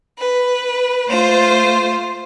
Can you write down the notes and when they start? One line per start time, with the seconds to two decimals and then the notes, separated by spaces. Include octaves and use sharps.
0.18 B4
1.08 A3 F4 C5